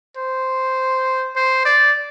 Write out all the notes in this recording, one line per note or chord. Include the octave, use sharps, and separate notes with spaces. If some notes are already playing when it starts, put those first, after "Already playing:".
C5
C5
D5